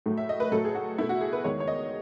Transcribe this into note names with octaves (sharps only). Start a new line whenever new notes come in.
A2 F#3 A3
E5
D#5
B4
A2 F#3 A3 A4
G#4
F#4
B2 A3 E4
F#4
G#4
B4
E2 D#3 G#3 C#5
C#5
D#5